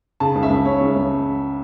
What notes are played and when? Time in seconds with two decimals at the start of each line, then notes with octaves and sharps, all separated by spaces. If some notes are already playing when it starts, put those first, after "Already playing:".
0.20 C#3 A5
0.36 C#2
0.43 E5
0.50 C#2
0.65 C#2 C#5
0.81 C#2
0.96 C#2